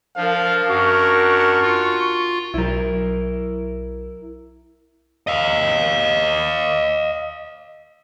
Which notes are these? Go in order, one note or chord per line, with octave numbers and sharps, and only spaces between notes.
F3 D4 A#4 F5
F#2 F#4 C#6
F4
B1 F#3 E4 A#4
D#5 F5